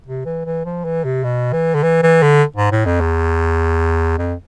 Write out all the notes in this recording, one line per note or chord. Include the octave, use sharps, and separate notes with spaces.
C3
E3
E3
F3
E3
C3
B2
E3
D3
E3
E3
D3
G#2
A2
F2
E2
F2